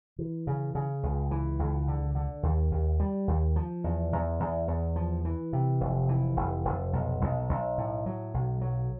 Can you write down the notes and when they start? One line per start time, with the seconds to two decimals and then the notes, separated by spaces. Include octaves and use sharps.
0.19 E3
0.47 C#3
0.75 C#3
1.03 C#2
1.31 E3
1.59 C#2
1.88 D3
2.15 D3
2.43 D#2
2.71 D#2
3.00 G3
3.28 D#2
3.56 F3
3.84 E2
4.13 E2
4.40 E2
4.68 E2
4.96 F3
5.25 E3
5.53 C3
5.81 F1
6.09 E3
6.37 F1
6.65 F1
6.93 B1
7.21 B1
7.49 B1
7.78 A2
8.06 F#3
8.34 B1
8.61 F#3